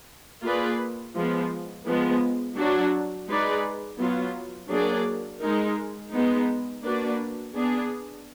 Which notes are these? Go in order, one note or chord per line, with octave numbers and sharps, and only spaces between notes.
A#3 F4 G#4 B4 D5
F3 G#3 B3
F3 G#3 B3
F#3 D4 F#4
G#3 D#4 G#4 B4 D5
F#3 B3 F4
F#3 A#3 D4 G#4 D5
G#3 D#4 A#4
G#3 B3 D#4
A#3 D4 F#4 B4 D5
B3 D4 G#4